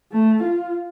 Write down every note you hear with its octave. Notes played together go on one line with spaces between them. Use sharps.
A3
F4